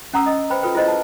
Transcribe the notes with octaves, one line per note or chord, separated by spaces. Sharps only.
C#4 F#5 A#5 D#6 E6
D#5 D#6
B4 C5 G5 B5
F4 A4 B4 G5
E4 G#4 B4 C5 D#5
B4 A5